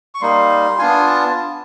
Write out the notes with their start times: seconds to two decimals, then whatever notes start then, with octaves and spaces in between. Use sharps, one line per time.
0.15 C#6
0.21 G3 A#3 D#4 C6
0.79 B3 D4 F4 G#5
1.07 A5